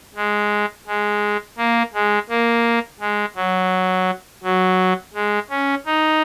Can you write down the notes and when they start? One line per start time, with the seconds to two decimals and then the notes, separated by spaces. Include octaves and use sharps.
0.15 G#3
0.87 G#3
1.58 A#3
1.94 G#3
2.29 A#3
3.00 G#3
3.36 F#3
4.43 F#3
5.14 G#3
5.50 C#4
5.85 D#4